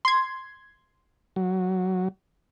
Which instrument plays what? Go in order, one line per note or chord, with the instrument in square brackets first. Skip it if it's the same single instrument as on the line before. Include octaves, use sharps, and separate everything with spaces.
[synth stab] C6 G#6
[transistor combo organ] F#3